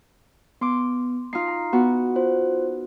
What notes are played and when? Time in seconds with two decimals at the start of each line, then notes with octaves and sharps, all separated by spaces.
0.61 B3 C6 D6
1.33 D#4 F4 C7
1.48 A#5
1.73 B3 F#4
2.16 F4 C5